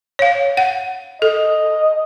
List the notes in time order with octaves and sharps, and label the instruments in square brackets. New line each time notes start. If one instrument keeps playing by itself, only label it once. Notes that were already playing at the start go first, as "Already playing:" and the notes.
[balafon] C#5 F5
F#5
[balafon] A4 [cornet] D#5